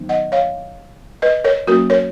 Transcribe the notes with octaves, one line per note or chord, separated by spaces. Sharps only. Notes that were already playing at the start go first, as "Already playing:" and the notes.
Already playing: D#3 F#3 B3 D#4
D#5 F#5
C#5 F5
B4 D#5
A#4 C#5
F#3 A#3 C#4 F#4 A#4
A#4 C#5